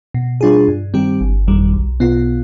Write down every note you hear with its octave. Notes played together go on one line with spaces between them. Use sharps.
B2
G3 D4 F4 G#4
G2
D#3 G3 C4 G4
G1
F2 D#3 G3
B1
B2 B3 F4